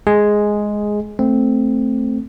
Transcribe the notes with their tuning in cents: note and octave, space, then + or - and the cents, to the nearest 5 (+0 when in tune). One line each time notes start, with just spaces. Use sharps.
G#3 +5 G#4 +0
A3 +0 C4 +0